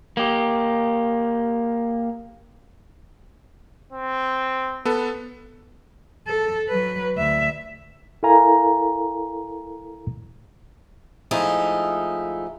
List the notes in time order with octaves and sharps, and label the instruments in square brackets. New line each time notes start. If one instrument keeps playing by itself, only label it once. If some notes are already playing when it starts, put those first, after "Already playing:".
[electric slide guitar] A#3 G4
[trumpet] C4
[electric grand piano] B3 A4 [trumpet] B4
[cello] A4
F#3 B4
D2 E5
[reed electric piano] E4 A4 A#4 F5 G#5 A#5
[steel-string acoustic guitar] F3 G#3 A3 D#4 E4